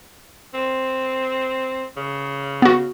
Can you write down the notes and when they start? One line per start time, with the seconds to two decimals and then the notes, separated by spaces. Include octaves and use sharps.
0.54 C4
1.97 C#3
2.62 B3 F#4